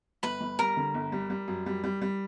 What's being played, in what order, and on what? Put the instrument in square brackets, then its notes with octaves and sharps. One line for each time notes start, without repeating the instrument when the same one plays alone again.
[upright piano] G1 [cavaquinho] B4 B5
[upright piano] G1
[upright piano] G3 [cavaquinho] A#4 A#5
[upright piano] D3
G1
G3
G3
F#2
G3
G3
G3